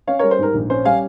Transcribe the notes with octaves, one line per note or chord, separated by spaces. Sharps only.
C#4 C#5 F5
G3 A#4 C#5
C5
G#2 A#4
A#1
C#4 C5
G3 F5 G#5